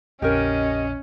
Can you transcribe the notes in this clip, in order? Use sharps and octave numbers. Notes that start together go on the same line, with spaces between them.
A#1 F2 C#4 G4 A#4 D#5